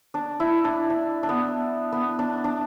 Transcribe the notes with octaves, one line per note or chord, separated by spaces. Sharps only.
D4
E4
D4
D4
D4
B3
B3
D4
D4